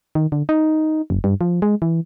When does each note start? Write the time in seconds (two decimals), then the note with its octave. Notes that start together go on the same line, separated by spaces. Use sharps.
0.15 D#3
0.32 D3
0.49 D#4
1.10 F#1
1.24 G2
1.41 F3
1.62 G#3
1.82 E3